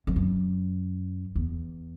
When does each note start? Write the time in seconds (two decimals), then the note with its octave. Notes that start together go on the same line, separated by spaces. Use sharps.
0.07 F2
0.16 F#2
1.36 E2